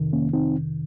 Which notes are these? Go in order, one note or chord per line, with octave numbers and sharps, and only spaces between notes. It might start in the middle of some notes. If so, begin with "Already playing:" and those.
Already playing: F2 C3 D#3
A#3 C#4
C4 D#4